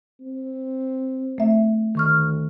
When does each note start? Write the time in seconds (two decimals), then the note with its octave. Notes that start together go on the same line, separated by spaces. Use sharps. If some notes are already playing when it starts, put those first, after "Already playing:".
0.21 C4
1.38 A3 E5
1.95 D2 D#3 C#6 F6